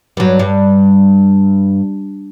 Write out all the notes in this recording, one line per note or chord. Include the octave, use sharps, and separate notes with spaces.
G2 F#3
G2